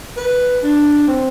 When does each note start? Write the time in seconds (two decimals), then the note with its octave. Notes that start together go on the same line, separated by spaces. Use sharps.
0.17 B4
0.63 D4
1.08 C4